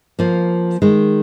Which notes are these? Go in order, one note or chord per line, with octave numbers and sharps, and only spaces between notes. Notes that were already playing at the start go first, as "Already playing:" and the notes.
F3 A#3
D#3 G#3